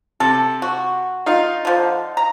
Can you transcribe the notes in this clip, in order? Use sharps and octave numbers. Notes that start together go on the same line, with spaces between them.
C3 A4
F#4
D#4 F4 F5
D3 F3
A#5